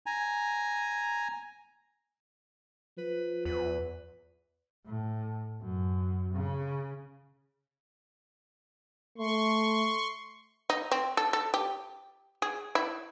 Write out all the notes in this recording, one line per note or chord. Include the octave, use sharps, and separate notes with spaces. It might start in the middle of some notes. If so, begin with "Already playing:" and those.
G#5 A#5
F3 B4
E2 B4
A2
F#2
C#3
A3 C6 C#6
D#4
C4
A4
A4
G4
G#4
E4